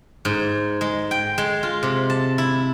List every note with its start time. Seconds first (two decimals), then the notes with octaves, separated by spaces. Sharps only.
0.25 G#2
0.81 G#3
1.11 G5
1.38 G#3
1.63 F4
1.83 C3
2.10 A5
2.38 E4